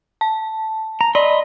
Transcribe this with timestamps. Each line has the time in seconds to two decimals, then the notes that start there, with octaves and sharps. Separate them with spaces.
0.21 A5
1.01 A#5
1.15 D5 D#5 B5 C6